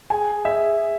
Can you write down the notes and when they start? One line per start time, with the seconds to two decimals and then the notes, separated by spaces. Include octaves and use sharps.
0.10 G#4 G#5
0.45 E5